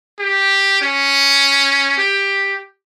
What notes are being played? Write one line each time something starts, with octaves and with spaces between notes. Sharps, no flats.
G4
C#4
G4